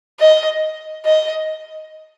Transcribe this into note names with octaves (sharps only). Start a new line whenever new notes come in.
D#5
D#5